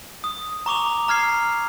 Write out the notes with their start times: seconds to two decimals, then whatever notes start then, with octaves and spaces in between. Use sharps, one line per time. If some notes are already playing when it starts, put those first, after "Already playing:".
0.24 D#6
0.66 A#5 C#6 D6 F7
1.08 A#5 F6 G#6 C7